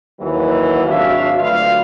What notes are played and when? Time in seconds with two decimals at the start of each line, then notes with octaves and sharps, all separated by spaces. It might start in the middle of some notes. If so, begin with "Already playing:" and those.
0.20 D#2 E3 F#3
0.85 G#1 F#3 D4 E5 F5
1.39 D2 F#3 F4 B4 D5 F5